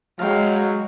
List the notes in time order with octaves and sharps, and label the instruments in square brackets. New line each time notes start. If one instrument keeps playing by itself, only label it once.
[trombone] F#3 [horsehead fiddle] G#3 [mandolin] F5 G5